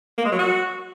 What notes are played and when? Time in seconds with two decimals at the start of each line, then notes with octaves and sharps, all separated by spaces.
0.18 A#3
0.25 G#3
0.32 F#3
0.39 F#4